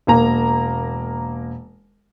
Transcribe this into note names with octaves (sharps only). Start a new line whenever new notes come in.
E1 A#3 A#5